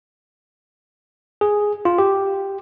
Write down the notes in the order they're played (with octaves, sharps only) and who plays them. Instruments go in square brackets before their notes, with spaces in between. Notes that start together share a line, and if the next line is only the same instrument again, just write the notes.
[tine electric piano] G#4
F4
G4